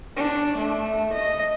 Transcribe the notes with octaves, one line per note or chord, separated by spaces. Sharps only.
D4
A3
D#5